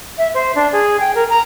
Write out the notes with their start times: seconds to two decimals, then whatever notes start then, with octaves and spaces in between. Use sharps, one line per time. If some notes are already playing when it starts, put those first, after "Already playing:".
0.18 E5
0.34 C5
0.55 D4
0.72 G#4
1.00 G5
1.15 A#4
1.29 A#5